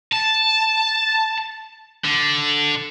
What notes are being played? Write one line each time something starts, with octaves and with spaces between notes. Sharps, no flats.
A5
D3